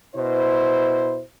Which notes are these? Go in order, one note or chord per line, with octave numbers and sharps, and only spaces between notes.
B2 E4 C5